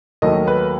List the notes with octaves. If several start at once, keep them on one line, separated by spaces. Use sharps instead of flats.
D#2 D#3 F#3 A3 D#5
B4